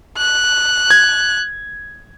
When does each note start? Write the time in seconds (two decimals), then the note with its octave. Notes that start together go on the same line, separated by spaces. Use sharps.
0.18 F#6
0.91 G#6